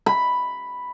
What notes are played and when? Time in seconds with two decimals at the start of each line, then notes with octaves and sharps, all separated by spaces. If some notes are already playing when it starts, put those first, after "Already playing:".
0.06 B5